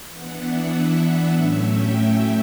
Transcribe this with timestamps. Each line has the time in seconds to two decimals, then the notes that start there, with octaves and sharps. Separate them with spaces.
0.10 E3 B3 D4 F#5
0.41 E5
1.32 A2 F#3 A3 C#4 E5
1.62 G5